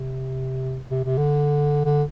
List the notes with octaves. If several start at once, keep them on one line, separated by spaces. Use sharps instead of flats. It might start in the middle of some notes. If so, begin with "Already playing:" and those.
Already playing: C3
C3
C3
D3
D3